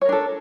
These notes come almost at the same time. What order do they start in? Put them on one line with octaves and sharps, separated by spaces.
C#5 A#4 D4 A4